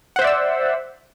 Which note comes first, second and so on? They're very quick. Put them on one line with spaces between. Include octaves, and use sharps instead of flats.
F#5 C5 E5 D5 E6